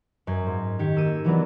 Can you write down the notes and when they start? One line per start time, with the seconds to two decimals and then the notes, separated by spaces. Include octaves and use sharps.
0.27 F#2 G#6
0.47 G#2
0.79 D#3 G4 G#6 C#7
0.95 A#3 E6 D#7
1.24 E3 F#3 B3 D4